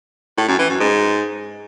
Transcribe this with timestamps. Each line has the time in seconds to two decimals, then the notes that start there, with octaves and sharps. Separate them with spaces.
0.38 A2
0.48 F#2
0.59 E3
0.70 F#2
0.80 G#2